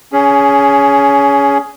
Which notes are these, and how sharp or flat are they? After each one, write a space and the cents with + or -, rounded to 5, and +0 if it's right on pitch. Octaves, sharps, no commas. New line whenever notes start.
C#4 +20 G#4 +0